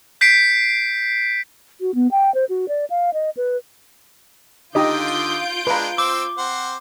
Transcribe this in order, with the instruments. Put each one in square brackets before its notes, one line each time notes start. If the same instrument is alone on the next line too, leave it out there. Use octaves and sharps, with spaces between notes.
[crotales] G6 B6 C7 D7
[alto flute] F#4
B3
G5
C5
F#4
D5
F5
D#5
B4
[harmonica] D3 D#6 [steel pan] D#4 G4 D#5 [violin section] F4 G6 D7
[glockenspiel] G7
[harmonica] G#3 D4 [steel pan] B4 A#5
[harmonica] C4 C5 E6 [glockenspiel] D6
[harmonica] C4 C5 F#5